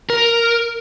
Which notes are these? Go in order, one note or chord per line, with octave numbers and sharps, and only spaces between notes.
A#4